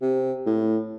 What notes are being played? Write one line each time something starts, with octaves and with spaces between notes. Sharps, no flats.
C3
A2